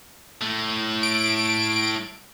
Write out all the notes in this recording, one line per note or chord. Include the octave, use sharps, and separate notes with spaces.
A2 A3
D7